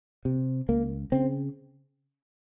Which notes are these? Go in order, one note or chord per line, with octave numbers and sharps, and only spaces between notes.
C3
C#2 A#3
C#3 C4